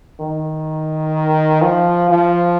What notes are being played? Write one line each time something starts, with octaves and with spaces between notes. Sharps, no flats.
D#3
F3
F3